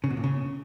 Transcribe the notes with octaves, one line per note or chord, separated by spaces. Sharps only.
C#3
B2
A#2
C#3